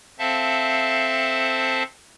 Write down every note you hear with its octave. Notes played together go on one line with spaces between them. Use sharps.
C4 A4 C5 E5 F5 A5